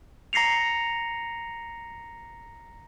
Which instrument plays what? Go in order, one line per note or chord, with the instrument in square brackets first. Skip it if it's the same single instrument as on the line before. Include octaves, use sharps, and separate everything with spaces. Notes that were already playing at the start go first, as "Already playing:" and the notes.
[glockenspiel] A#5 A#6 C7 C#7 F7